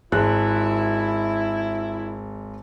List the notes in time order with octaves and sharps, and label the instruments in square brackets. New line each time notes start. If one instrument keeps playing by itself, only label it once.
[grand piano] G#1 G#3 F#6 [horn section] E4